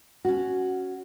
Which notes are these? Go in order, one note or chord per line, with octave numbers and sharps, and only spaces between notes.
C#4 F#4